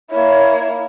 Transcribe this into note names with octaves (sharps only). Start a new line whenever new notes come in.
A#3 E4 C#5